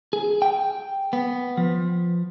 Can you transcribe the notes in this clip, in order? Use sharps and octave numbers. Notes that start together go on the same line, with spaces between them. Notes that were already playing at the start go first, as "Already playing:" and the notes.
G#4
G5
B3
F3